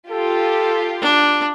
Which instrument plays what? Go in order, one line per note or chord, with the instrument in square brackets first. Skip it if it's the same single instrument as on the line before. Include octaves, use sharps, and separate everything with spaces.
[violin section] F4 G4 [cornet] A4
[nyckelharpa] D4